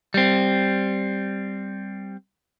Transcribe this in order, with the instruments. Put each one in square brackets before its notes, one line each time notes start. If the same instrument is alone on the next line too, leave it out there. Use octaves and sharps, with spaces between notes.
[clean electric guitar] G3 C4